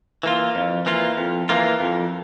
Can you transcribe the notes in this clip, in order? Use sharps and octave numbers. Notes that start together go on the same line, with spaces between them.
E3 A#3 F4
F2
E3 A#3 F4
F2
E3 A#3 F4
F2